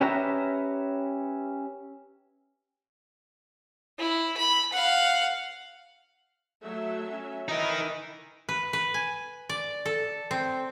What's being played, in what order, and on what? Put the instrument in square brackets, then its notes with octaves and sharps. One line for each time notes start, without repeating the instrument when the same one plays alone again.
[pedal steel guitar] C#4 G4 B4 E5 A#5
[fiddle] E4
B5
F5 F#5
[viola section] F#3 E5 [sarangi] A3
[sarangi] C#4
[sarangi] E3 [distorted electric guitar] D#4 A#4 [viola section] B4 B5 [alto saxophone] D#5
[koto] B4
B4
G#5
D5
A4
C4